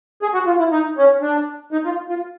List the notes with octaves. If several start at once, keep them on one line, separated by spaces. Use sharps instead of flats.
G#4
F#4
F4
E4
D#4
C#4
D4
D#4
F4
F4